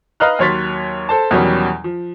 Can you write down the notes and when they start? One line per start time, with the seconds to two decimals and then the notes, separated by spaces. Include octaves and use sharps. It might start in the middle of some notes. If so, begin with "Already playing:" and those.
0.20 B4 D#5 F5 A#5 F6 F#6
0.39 D#2 F#3 C#5 C6 A6 B6
1.09 A4 C5 A5
1.31 E2 B2 D#3 F#3 G3 C#4
1.84 F3